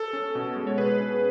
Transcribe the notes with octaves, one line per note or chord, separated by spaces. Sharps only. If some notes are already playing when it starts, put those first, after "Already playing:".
Already playing: A4
C#4
B2
G#3
C#5
B2 G#4 B4
C#4